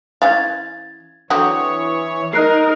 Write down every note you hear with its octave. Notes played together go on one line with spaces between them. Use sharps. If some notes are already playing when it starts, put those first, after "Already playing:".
E3 C#4 F5 G#6 A6
D3 E3 F#3 C4 C#5 D#6
D#4 A#4 D#5 F#6 C7